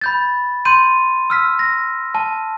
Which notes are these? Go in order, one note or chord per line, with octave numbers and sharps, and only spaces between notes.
B5 G6 A6
C6 G6 D#7
E6 F6 B6
A#6
A5